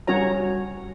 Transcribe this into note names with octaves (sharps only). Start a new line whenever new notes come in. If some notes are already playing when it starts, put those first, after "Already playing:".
G3 C#4 F#4 C#5 A#5